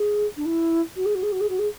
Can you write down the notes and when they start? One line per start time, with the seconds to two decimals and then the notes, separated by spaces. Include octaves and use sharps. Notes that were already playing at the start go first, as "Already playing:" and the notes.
Already playing: G#4
0.37 D4
0.45 E4
0.96 F#4
1.05 G#4
1.15 F#4
1.23 G#4
1.32 F#4
1.40 G#4
1.49 F#4
1.59 G#4